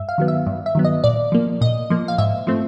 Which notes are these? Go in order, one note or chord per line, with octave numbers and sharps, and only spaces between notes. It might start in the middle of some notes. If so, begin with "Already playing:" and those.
Already playing: G2 E5
F5
D#3 F#3 B3
E5
G2
E5
D#3 F#3 B3
D#5
A#2 D5
F3 A#3
A#2 D#5
F3 A#3
F5
G#2 E5
F3 A3 C4